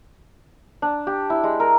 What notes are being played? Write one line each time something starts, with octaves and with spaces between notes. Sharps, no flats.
D4
G4
E4
G#3
A#4